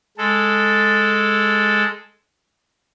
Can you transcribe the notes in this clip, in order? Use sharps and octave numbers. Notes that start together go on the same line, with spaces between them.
G#3 A4